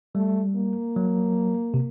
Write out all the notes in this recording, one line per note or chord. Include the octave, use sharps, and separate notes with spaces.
G3 A3
A#3
F#3
C3